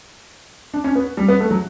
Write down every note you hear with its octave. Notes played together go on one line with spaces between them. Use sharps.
D4
C#4
B3
G3
B3
A3
F#3